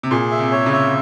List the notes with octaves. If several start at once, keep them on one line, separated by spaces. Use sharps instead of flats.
C3
A#2 G#4
E5
C3
C#5
C#3
E5